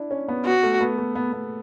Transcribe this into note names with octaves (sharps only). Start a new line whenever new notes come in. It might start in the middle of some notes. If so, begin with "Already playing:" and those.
Already playing: D4 E4
C#4
B3
B3 F#4
A3
B3
A3
B3
B3